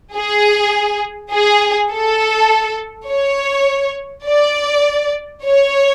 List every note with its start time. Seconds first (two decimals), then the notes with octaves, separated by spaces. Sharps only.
0.15 G#4
1.33 G#4
1.92 A4
3.08 C#5
4.27 D5
5.44 C#5